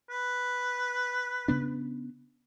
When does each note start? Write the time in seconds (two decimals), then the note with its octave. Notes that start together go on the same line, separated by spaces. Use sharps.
0.10 B4
1.48 C#3 B3 D4